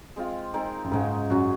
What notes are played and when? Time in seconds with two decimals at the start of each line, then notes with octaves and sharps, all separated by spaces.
0.16 G#3 C4 F4
0.54 G#3 C4 D#4 A#4
0.84 F#2
0.92 G#2 C#3 G#3 D#4
1.30 F#2 F#3 C#4 F#4